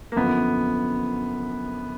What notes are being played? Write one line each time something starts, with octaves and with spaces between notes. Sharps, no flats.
A#3
F#2 D3 F3 B3